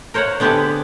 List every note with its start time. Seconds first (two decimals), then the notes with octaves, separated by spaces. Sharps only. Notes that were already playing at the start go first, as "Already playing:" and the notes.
0.14 A#4 C5 C#5 F5 F#5
0.40 D3 B3 C4 G4 G#4 A5